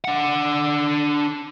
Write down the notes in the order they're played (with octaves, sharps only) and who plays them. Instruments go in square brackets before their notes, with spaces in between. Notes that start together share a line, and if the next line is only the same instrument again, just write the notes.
[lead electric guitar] D4 F#5